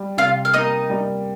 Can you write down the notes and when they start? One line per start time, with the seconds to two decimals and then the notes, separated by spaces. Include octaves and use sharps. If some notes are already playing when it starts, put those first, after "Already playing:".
Already playing: G3
0.17 C3 F4 F5
0.45 F5
0.54 A#3 D#4 D#5
0.90 G3